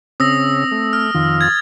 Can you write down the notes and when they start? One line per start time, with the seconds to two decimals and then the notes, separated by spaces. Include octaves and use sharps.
0.20 C#3 C4 C#4 D#6 E6 A#6
0.71 A3
0.93 F6
1.15 F2 D#3 F4
1.41 G#6 A6